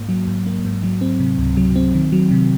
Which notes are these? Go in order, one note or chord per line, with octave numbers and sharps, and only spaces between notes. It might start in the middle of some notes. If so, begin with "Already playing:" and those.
Already playing: G#2 A#3
F#3
G#2
A#3
G#2
F#3
C4
C3
C#2
F#3
C4
D#3
F#3
C3